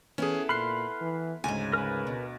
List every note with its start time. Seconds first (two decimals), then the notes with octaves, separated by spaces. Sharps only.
0.18 E3 B3 C#4 E4 G#4 A4
0.49 A#2 B5 C6 F6 F#6 C7
1.01 E3
1.44 D2 G#2 C#3 G#5
1.73 A#4 B4
2.07 B2